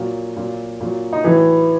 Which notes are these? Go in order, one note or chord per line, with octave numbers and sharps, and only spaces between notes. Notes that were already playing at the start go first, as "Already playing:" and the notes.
Already playing: A#2 F#3
A#2 F#3
A#2 F#3
D#4
A2 E3 F#3 E4